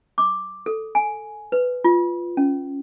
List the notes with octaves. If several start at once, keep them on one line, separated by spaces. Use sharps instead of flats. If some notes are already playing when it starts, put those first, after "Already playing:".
D6
A4
G#5
B4
F4
C#4